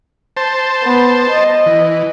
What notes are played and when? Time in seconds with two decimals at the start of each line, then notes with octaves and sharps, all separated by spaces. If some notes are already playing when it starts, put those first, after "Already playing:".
0.37 C5 A5
0.83 B3
1.30 D#5
1.66 E3